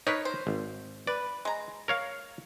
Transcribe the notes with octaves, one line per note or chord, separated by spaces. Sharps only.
D#4 A#4 B4 C#5
C5
G#1
B4 D5
G#3 A#5
A#4 C#5 F5